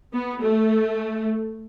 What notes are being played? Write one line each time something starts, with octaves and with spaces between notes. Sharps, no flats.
B3
A3